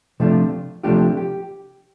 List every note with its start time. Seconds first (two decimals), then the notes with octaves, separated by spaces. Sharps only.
0.20 C3 F3 A3 D4 F4
0.83 C3 F3 A3 D4 F4 G4
1.17 G4